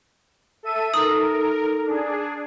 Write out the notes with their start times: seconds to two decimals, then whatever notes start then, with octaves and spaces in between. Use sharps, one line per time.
0.63 A4 E5 D#7
0.94 D#4 A4 A#4 D#6
1.86 D4 G#4